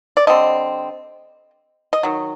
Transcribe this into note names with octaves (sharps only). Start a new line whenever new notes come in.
D5
D3 G3 C4 D#5
D#5
D#3 F#3